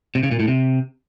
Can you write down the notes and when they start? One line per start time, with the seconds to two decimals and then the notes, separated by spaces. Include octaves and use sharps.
0.15 C3
0.23 C#3
0.31 A#2
0.40 A2
0.48 C3